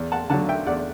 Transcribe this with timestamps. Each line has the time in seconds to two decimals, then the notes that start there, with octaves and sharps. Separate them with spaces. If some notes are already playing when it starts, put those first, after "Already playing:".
Already playing: E2
0.12 F#5 A5
0.30 D3 F#5 A5
0.34 F#3
0.49 E5 G5
0.67 E2 D5 F#5